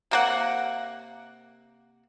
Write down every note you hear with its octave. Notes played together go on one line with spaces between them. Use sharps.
C3 A#3 F#5